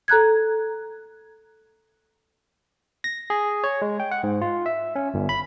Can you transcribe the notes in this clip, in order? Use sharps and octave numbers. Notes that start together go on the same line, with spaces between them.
A4 A#5 F#6 G#6
A#6
G#4
C#5
G#3
G5
F#5
G#2
F4
E5
C#4
G1
B5